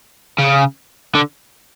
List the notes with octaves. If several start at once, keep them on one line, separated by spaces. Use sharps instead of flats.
C#3
D3